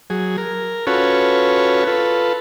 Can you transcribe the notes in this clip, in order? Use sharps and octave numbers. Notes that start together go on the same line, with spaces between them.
F#3 G#4
A#4
C#4 F4 F#4 A4 B4 C#5
F4 A4 B4